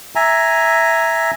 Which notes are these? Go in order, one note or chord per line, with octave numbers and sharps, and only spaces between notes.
E5 G#5 A#5